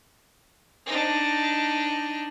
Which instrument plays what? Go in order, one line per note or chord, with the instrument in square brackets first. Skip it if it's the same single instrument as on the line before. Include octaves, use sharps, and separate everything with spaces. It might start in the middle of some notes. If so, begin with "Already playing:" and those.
[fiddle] D4 D#4